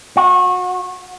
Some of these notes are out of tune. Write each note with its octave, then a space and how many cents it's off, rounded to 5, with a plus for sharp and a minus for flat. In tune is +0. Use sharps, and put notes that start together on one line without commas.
F#4 -30